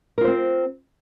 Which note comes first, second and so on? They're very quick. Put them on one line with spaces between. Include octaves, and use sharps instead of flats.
A#4 F4 C5 C4